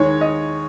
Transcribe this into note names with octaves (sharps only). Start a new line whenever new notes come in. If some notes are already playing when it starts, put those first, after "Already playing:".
Already playing: D#2 D#3 G#3 C#5
D#5